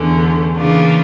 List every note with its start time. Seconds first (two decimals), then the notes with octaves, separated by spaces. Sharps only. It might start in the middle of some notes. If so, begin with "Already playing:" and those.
Already playing: E2 D3 A3 C#4
0.55 C#3 E3 A#3 D4 F4